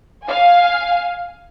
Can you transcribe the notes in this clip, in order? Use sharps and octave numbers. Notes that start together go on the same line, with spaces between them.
F5 G#5